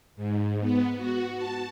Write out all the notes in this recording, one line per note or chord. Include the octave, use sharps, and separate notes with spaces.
G#2
B3
F#4
A5